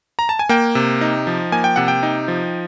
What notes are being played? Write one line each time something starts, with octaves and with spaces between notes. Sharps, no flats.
A#5
A5
G#5
A#3 G5
C3
D#4
F3
A#3 G#5
G5
C3 F#5
G5
D#4
F3